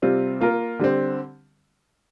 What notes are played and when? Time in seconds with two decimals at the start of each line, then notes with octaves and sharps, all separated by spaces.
0.02 C3 G3 C4 F4
0.41 A#3 F4 A#4
0.79 D3 G3 C4